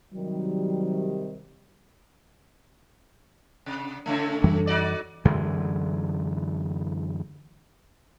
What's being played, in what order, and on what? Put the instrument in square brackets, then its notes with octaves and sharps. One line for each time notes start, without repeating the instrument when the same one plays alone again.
[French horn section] C3 D#3 G3 [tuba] F#3
[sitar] C3
A2 C#3 A3
[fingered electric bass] F#2 E3 G3
[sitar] D#4 F#4 D5
[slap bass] F#2 D3 E3 G#3